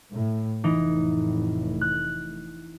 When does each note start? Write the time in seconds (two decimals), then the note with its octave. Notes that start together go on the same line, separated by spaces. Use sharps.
0.12 A2
0.64 F1 A2 E3 D#4
1.81 F#6